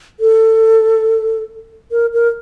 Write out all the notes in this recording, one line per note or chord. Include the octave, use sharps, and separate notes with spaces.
A4
A#4
A#4